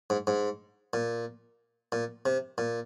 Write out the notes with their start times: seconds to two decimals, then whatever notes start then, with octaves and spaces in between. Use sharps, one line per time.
0.10 G#2
0.27 G#2
0.93 A#2
1.92 A#2
2.26 C3
2.58 A#2